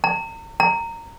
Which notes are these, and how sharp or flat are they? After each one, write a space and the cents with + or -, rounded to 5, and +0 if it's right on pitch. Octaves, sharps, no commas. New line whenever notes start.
A#5 -40
A#5 -20